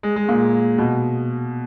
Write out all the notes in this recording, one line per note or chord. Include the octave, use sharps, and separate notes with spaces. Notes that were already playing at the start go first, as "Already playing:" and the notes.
G#3
G#3
A#2
B2